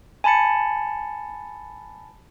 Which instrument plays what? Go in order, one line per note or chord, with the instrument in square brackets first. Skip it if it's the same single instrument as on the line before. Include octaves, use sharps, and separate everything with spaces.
[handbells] G#5 A5 B5 A6 C#7